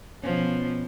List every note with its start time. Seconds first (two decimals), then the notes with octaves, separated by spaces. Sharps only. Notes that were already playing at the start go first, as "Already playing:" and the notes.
0.24 B2 F3 B3 C#4